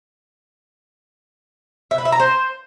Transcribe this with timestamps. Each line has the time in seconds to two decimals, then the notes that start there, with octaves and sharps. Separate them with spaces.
1.91 E5
1.98 B4
2.05 E5
2.12 A#5
2.20 C5